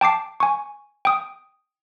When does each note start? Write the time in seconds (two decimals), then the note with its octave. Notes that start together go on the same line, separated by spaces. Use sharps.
0.01 G5 A5 D6 C7
0.40 G#5 C#6
1.05 G5 D#6